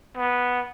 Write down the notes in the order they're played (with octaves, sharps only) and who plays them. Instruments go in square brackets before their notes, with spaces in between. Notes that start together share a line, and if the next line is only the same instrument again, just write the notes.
[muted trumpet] B3